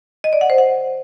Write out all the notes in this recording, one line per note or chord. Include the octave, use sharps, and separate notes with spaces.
D#5
D5
F#5
C5
F#5